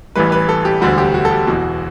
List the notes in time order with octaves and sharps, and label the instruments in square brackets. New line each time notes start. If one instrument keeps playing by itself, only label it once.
[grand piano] A1 A2 E3 G3 B4
B4
A4
G4
E1 D2 D3 G3 F#4
G4
F#4
A4
G4
E1 E2 B2 F#4